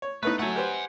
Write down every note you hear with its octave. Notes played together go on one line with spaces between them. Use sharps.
C#5
A3 B3 D#4 B4
F#3 A3 F#5 G#5
G4 B4 C5